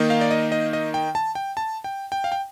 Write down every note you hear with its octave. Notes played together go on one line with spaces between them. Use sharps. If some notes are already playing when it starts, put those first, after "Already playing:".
Already playing: D#3 A#3 D#4
F5
D5
D#5
D#5
D#5
G5
A5
G5
A5
G5
G5
F5
G5